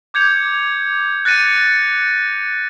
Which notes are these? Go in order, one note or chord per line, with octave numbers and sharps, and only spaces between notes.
D6 G6 G#6 C#7 F7
F#6 A6 A#6 C#7 D#7